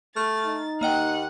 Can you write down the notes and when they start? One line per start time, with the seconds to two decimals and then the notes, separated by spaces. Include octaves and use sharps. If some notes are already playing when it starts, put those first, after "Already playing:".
0.16 A3 F6 A6
0.45 D#4
0.81 D#2 A#3 D#5 F#5 G5